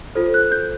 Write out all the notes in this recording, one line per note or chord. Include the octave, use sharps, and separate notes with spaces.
F4 A4 C5
F#6
G6